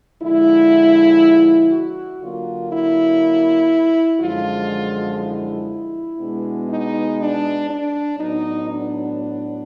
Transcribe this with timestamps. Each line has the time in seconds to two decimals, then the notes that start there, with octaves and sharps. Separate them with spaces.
0.21 D3 F3 G#3 E4
1.71 F#4
2.20 D3 F#3 A#3 F4
2.71 E4
4.20 F#2 D3 F3 G#3 F4
5.20 E4
6.20 B2 G#3 B3 D4
6.69 D#4
7.19 D4
7.69 D4
8.18 A2 F#3 B3 D4 D#4
8.68 D4